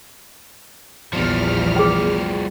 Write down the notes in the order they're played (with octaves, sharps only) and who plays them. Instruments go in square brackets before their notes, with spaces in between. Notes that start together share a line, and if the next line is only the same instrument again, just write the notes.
[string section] A#1 E2 F6 [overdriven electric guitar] F3 G3
[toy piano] G#4 G5